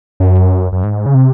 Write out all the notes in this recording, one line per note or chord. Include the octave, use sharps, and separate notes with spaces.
F#2
F#2
G#2
C#3
C3